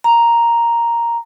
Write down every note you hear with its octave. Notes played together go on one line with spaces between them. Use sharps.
A#5